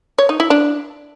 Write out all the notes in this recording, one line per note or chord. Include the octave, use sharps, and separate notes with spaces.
C#5
D#4
E4
D4